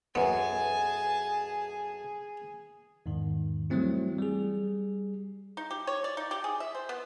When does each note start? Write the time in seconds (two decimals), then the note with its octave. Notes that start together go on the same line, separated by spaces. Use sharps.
0.15 B1 F#2 B3 G#4 G#5 A5
3.06 E2 G#2 D#3
3.70 E3 F#3 G3 A3 C4 E4
4.18 G3 G#4
5.57 D#4
5.71 G4
5.87 C#5
6.04 D5
6.17 D#4
6.31 G4
6.44 G#4
6.60 E5
6.75 C5
6.89 B3